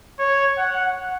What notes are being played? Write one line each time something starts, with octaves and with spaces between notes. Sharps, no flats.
C#5
F#5